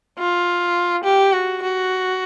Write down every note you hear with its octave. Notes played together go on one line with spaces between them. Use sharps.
F4
G4
F#4
F#4